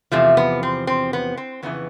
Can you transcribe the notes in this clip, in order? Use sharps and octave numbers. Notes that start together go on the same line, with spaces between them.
E2 C3 F3 A3
B3
C4
C4
B3
C4
F2 C#3 E3 B3